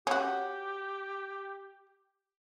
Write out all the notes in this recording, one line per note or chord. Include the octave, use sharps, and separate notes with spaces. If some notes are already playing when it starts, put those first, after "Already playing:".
C#4 F#4 G4